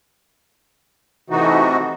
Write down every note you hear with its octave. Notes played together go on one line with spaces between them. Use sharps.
C3 E3 A3 D#4 F#4